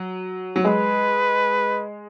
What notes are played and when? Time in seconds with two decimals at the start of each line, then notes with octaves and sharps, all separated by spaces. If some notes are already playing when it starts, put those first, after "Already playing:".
Already playing: F#3
0.56 F#3
0.64 G#3 B4